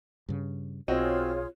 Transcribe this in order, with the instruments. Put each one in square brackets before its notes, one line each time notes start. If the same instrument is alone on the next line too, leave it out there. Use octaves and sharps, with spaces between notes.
[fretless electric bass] G2 C#3
[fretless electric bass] B1 [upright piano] C4 F#4 D#5 [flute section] F4 G#4 C#5